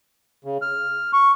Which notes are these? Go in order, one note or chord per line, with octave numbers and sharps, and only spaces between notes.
C#3
F6
C#6